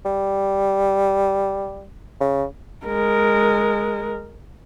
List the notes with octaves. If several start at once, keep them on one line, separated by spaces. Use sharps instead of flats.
G3
C#3
G#3 A#4